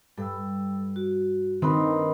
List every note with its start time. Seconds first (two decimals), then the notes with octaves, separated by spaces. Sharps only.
0.18 G2 A4 G5 E6
0.96 F#4
1.62 D#3 C4 D4 A#4 B4 D#6